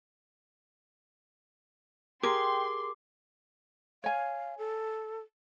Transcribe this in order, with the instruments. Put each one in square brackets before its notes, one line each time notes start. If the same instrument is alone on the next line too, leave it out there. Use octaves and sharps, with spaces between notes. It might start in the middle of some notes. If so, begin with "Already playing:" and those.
[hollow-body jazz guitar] G4 G#4 A#4 [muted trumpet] G5 [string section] C6 [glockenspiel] D6
[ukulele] C#5 G#5 [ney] F5
[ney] A4